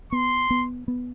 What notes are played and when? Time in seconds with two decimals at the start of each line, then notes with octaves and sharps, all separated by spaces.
0.12 B3 C6
0.50 B3
0.88 B3